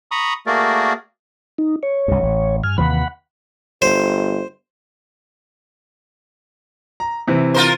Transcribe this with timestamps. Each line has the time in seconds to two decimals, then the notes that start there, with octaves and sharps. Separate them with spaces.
0.11 A#5 B5 C#6 D#6
0.47 A3 A#3 F#4 G#4 A#4 D5
1.58 D#4
1.83 C#5
2.08 C2 G2
2.23 A1
2.64 G2 G#5 F6
2.78 D#2 C3 E3 F#5 B5
3.82 G1 C5
7.00 A#5
7.28 C3 E3
7.54 F4 A#4 C5